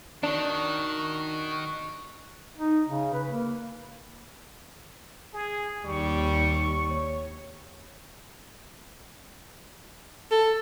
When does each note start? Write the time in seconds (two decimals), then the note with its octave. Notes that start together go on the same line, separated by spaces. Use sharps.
0.23 D#3 D4 F#4
2.58 D#4
2.87 C#3
3.13 B4
3.29 A#3
5.33 G#4
5.85 D#2 G3 C#6
6.90 C#5
10.32 A4